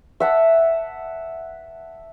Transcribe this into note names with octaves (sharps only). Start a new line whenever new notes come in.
E5 F#5 A5